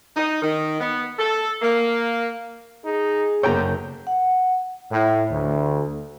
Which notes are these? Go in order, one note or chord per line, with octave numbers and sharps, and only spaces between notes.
D#4
D#3
B3
A4
A#3
D#4 G#4
F#1 D3 C#5 G5 A#5 G6
F#5
A2
D2